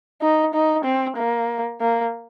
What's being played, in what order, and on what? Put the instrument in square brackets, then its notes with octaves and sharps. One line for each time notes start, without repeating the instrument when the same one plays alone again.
[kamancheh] D#4
D#4
C4
A#3
A#3